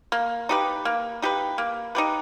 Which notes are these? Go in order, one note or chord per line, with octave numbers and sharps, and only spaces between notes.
A#3
D#4 G4 B4
A#3
D#4 G4 B4
A#3
D#4 G4 B4